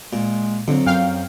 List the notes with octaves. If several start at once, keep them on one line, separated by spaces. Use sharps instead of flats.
A#2 G#3
F2 D3 F#3
F#2 F5 G5